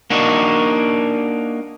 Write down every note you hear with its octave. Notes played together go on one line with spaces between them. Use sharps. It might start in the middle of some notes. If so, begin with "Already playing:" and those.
A#3 D4 D#4 F#4